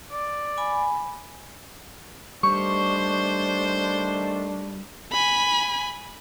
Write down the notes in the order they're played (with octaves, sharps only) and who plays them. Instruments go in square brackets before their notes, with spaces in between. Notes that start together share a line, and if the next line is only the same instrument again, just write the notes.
[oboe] D5
[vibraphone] G#5 B5
[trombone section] D#3 A3 D4 [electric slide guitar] G3 [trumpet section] C5 [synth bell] C#6
[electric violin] G#5 B5